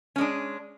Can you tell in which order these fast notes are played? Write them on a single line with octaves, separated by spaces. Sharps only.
C#4 G#3 D4